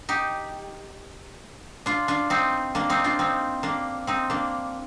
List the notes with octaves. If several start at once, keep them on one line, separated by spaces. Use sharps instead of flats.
D#4 G4
D4 F4
D4 F4
C4 D#4
A#3 D4
C4 D#4
D4 F4
C4 D#4
A#3 D4
C4 D#4
A#3 D4